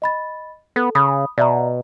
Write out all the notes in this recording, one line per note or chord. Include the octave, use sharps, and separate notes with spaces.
D#5 B5 A6
B3 A4
C#3 B5 D#6
B2 D5 E5 A#5